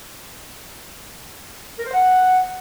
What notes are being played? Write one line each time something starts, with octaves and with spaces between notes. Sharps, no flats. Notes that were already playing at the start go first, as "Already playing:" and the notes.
A#4
C5
F#5